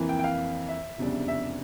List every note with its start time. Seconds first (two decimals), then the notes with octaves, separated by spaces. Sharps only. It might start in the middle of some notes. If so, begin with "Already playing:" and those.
Already playing: F2 E3 A#3 E4
0.09 G5
0.19 G5
0.24 F5
0.69 E5
0.98 F1 E2 C#3 G3 D4
1.28 E5